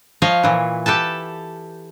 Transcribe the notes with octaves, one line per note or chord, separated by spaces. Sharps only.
F3 C#5 D#5 F5
A#2 E3
G4 A4 B4 A5